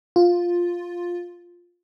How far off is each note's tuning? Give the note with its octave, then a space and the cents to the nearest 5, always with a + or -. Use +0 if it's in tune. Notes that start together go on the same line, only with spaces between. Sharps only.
F4 +5